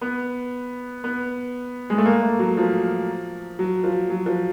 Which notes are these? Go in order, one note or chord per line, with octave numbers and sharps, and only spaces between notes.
B3
B3
G#3
A3
A#3
A3
F#3
F3
F#3
F3
F#3
F3